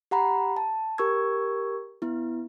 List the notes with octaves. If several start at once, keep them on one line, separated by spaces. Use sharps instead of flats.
G4 F#5 A#5 B5
A5
G4 A#4 C#6 E6 G#6
B3 E4